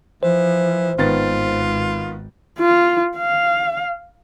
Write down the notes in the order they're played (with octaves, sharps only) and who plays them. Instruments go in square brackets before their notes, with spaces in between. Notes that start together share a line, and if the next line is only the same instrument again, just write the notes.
[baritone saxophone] E3 [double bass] F3 [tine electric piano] C5
[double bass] G#1 [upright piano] D#3 B3 A6 [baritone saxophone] F4
[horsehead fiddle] F4
F5